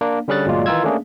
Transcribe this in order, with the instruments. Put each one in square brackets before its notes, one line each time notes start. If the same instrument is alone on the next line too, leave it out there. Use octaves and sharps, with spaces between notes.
[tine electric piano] A#3 D4
D3 G3 C#4 G#4 F#6 A6
G1 A#2 F#3 G#3 F4 D5
D#3 E3 D#4 F4 E6 G#6
A3 A#3 C#4 D4 G#4